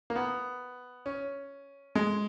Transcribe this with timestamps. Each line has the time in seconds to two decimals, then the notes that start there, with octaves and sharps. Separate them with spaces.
0.10 A#3
0.16 B3
1.06 C#4
1.95 G#3